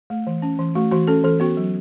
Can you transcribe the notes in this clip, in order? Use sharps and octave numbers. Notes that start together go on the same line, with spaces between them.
A3
E3
C#4
E3
A3 F#4
E3 F#4
C#4 A4
E3 A4
B3 F#4
F#3